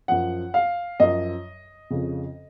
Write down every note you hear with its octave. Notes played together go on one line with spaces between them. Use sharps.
F#2 F3 F#5
F5
F#2 F3 D#5
F2 C#3 F3